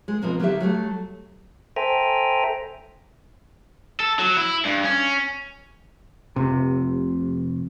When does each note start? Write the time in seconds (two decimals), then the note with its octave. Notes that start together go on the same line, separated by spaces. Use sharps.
0.08 G#3
0.22 B2 F3 A#3 C4
0.39 D3 F#3 A#3 D#4 G4 E5
0.60 F#3 G3 A3
1.76 A4 C5 E5 G5 G#5 A#5
4.00 A4
4.19 F#3
4.37 E4
4.65 G2
4.84 C#4
6.36 F1 C3